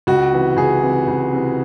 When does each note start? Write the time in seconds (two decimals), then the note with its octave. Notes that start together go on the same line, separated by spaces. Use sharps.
0.07 C#2 F#4
0.32 C3 E3
0.57 C#2 G#4
0.82 C3 E3
1.08 C#2
1.32 C3 E3